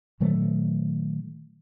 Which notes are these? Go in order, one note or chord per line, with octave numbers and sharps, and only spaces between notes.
A#2 D#3 F#3 A3